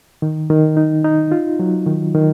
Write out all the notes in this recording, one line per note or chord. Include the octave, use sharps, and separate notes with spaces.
D#3
D#3
D#4
D#4
F4
F#3
D#3
D#3